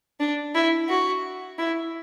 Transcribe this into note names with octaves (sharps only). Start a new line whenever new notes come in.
D4
E4
F#4
E4